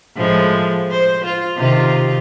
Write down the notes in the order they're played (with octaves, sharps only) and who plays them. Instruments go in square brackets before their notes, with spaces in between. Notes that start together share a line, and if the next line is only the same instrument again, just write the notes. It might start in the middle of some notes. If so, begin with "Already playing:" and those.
[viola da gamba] A2 F3 G#3
C5
F4
C3 D#3 F4